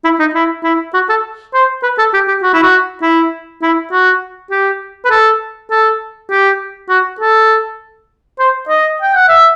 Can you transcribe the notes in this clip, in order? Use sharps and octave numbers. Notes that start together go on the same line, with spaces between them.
E4
D#4
E4
E4
F#4
A4
C5
B4
A4
G4
G4
F#4
E4
F#4
E4
E4
F#4
G4
B4
A4
A4
G4
F#4
A4
C5
D#5
G5
F#5
E5